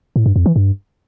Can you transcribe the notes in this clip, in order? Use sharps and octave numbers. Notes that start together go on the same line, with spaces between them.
A2
G2
F2
E3
G2